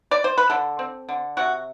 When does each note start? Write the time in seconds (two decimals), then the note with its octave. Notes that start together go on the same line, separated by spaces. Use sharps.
0.11 D5
0.24 C5
0.37 B4
0.50 D3 A4
0.79 C4
1.09 D3
1.37 C3 F#4